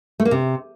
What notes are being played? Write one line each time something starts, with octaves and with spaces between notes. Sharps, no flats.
A3
A#3
C3